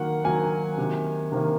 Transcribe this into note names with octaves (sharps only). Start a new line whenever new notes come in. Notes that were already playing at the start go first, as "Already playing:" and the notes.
Already playing: D#3 F#3 A#3 F#5
D#3 F#3 A#3 G#5
C3 D#3 A#3
C3 D#3 A#3